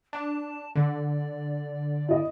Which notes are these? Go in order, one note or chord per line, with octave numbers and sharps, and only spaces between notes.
D4 A5
D3 D5
E4 D#5